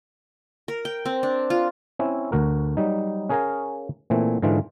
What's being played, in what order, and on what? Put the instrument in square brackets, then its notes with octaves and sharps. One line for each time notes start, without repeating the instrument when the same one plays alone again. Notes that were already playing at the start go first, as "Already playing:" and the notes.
[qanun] A#4
G5
C4
D4
F4
[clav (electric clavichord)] C4 C#4 E4
D2 F#4 A#4
F#3 G3 D#4
C#4 G#4 A#4 F5 G#5 A#5
A#2 E3 A3 C4
G#2 D3 E3 F4